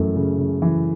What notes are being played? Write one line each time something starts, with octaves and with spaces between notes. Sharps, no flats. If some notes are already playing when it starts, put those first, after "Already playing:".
Already playing: F#2 E3 A3
C#3
C#3
E3